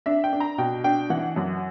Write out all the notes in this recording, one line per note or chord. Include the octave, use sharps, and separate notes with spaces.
D4 E5
G5
D4
A#5
B2 G5
D4 G5
E3 F#5
F#2